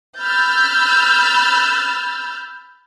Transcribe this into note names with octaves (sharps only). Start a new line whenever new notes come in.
B5 E6 F6 G6 A6